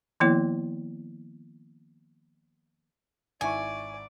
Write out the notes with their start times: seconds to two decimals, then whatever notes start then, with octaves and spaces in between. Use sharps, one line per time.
0.20 D#3 F3 A#3 B3 E4 C#5
3.41 G#1 E4 D5 G#5 C#6